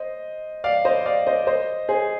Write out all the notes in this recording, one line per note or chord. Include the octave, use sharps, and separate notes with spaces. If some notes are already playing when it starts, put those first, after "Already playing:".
Already playing: C5 D#5
D5 F5
C5 D#5
D5 F5
C5 D#5
C5 D#5
G#4 C5